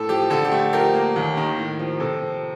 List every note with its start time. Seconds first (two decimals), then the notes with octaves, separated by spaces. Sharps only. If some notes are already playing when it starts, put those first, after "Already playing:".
Already playing: A2 A4
0.09 F3 G4
0.30 D3 A4
0.44 G4
0.52 A3
0.59 A4
0.73 F3 G4 A#4
0.94 A#3
1.16 D#2
1.37 D#3
1.58 A2
1.79 F3
2.00 C3 A4
2.22 F3